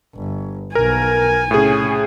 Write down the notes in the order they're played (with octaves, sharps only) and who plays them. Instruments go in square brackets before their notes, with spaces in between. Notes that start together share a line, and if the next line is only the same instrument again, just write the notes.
[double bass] G1
[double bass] B1 B2 [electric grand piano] A#4 [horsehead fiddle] G#5
[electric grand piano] A2 G#4 [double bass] C3 C#4